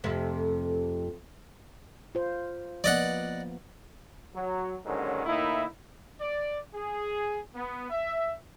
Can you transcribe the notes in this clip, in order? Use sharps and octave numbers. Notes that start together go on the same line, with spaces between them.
F2 C3 A3
F4 C5
F3 A#3 B3 D5 D#5 F#5
F#3
D#2 G#2 D3 D#3 F#3 C#4
A2 D#3 A#3 D#4 E4
D5
G#4
B3
E5